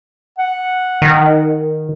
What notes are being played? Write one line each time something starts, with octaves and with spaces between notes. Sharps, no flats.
F#5
D#3